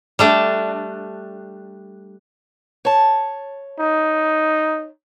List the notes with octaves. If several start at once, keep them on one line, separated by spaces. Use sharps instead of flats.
G3 A3 D4
C#5 A5
D#4